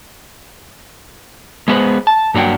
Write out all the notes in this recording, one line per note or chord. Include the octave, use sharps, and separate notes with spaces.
G#3 B3 G#4 B4 C5
A5
G2 F#3 A#3 D4 F#5 G5